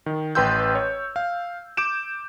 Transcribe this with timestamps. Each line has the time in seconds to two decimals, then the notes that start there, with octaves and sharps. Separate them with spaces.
0.06 D#3
0.35 A1 B4 G5 C6 E6 G6
0.75 C#5
1.16 F5
1.77 D6 G6 D7 E7